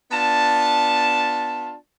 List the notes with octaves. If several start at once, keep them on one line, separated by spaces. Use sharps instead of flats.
B3 D4 F4 A5